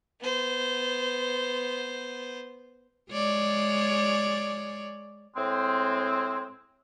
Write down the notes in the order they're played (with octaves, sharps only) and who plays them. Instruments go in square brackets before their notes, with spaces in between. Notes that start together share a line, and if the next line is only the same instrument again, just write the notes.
[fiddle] B3 C5
[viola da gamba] G#3 C#5 D5
[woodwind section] A2 G#3 C4